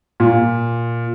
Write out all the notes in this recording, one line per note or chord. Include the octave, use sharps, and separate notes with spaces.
A#2